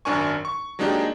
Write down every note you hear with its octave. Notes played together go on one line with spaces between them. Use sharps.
G#1 F#2 D4 A#4 G#5 C#6
C#6
F#3 G#3 A#3 D4 D#4 G4